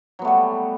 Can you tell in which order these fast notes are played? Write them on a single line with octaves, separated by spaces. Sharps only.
F#3 B3 A3 G3